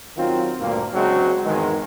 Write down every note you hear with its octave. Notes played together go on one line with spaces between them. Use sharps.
D#3 F#3 C4 F4
D2 G2 A#2 A#3
C#3 F#3 G#3 C4 D4 F#4
G#1 E2 D#3 G#3